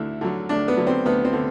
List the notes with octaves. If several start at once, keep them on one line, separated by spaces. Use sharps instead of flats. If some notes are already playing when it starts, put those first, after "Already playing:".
Already playing: D2 D3 E4
D3 F#3
D2 D4
B3
D3 F#3
C4
D2 B3
C4
D3